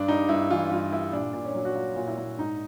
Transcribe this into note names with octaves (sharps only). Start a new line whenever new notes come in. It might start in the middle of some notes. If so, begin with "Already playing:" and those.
Already playing: G2 D4
G3 D#4
G2 E4
E3 F4
G2 F4
G3 E4
A#2 D4
A#2 D4
C#4
F#3
F#4
F#3 F4
A#2
E4
A#2
G#2 D#4